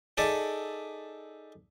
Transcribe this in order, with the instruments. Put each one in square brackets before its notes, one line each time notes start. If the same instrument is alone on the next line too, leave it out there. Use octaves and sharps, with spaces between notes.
[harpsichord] D#4 G#4 A4 D5 E5